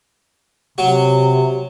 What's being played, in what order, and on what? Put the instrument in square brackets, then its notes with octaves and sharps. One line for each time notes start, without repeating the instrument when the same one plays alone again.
[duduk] C3 [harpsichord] F#3 F#4